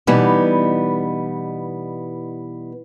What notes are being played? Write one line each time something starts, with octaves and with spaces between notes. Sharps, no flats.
B2 E3 G3 B3 D#4